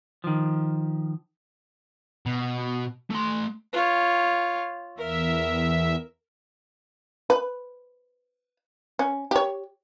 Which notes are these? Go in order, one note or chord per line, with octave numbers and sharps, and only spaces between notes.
D#3 F3
B2
A3 C6
F4 C#5
E2 A#4 E5
B4
C#4
G4 C#5